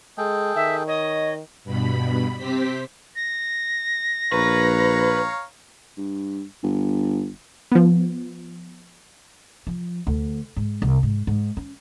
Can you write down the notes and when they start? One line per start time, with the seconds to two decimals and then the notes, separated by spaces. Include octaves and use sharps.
0.18 G#3 G#4 A4 G5
0.56 D#3 E5
0.87 C#5 D#5
1.64 G2 B2 B5
2.36 C3 C4 G4 C5 B6
3.16 A#6
4.32 A#1 B4 C#5 F5 A#5
5.97 G2
6.63 G1
7.72 F3 B3
9.67 F3
10.07 D2
10.56 G#2
10.82 C2
11.03 G#2
11.27 G#2
11.57 C#4